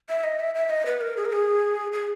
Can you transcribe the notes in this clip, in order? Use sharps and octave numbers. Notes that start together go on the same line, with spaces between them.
E5
D#5
E5
E5
D#5
B4
A#4
G#4
A#4
G#4
G#4